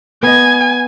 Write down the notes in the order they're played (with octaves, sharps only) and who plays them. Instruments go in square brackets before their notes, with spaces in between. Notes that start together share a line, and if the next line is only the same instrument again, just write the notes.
[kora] B3 D#5 [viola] G#5